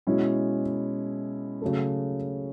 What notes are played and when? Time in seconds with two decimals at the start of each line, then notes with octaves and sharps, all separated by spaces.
0.07 B2 G#3 C#4 E4
1.62 C#3 F#3 A3